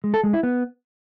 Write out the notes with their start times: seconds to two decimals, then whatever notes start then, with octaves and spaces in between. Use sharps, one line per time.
0.04 G#3
0.14 A4
0.24 G#3
0.33 E4
0.43 B3